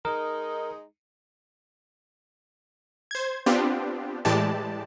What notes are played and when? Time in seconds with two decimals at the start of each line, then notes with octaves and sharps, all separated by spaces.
0.05 G#3 D#4 A#4
3.11 C5 G#6
3.46 B3 C4 D4 F4 G4
4.25 A2 E3 G#3 G4 D5 A5